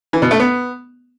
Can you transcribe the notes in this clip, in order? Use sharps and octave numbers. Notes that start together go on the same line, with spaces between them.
E3
B2
A3
B3